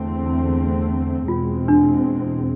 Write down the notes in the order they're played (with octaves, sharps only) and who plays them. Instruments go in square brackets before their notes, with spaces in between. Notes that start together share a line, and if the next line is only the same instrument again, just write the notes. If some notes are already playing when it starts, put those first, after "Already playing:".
Already playing: [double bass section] E2 D3 A3 C4
[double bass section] E2 B2 G#3 C4 [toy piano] F4
[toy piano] D4